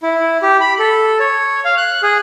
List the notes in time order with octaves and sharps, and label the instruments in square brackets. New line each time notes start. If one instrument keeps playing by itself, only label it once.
[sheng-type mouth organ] E4
G4
B5
A4
C#5
F5
F#6
G#4